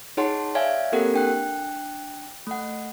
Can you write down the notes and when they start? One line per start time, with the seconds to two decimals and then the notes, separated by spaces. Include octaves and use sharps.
0.17 D#4 G#4 C#5 F#5 A5 C6
0.55 C#5 D5 E5 F5 G#5 G#6
0.92 A#3 C4 G4 A4 A#4 F#5
1.14 D4 G5 F#6
2.47 A3 F#5